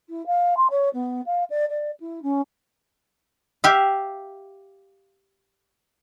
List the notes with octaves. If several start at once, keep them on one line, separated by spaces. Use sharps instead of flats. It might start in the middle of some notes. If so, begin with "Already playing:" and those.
E4
F5
C6
C#5
B3
F5
D5
D5
E4
C#4
G4 E5 F5